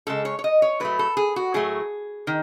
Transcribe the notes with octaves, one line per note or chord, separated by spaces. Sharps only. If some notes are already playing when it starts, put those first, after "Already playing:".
C#3 G#3 A4
C#5
C#5
D#5
C#5
A2 F#3 A3 B4
A4
G#4
F#4
A2 F#3 A3 G#4
D#3